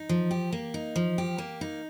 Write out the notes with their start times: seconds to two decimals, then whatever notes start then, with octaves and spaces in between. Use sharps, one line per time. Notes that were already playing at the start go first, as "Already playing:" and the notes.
Already playing: D#4
0.09 F3
0.31 G4
0.52 A#3
0.74 D#4
0.96 F3
1.18 G4
1.38 A#3
1.61 D#4